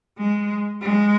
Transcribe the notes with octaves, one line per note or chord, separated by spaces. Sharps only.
G#3
G#3